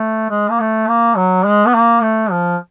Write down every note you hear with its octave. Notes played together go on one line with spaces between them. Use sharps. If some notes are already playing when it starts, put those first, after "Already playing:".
Already playing: A3
G#3
A#3
A3
A#3
F#3
G#3
B3
A#3
A3
F3